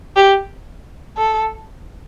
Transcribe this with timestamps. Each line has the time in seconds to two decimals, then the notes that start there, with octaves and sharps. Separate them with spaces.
0.16 G4
1.17 A4